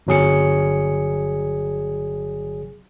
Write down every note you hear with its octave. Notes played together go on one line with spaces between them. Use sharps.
G1 F#3 G#4 C#7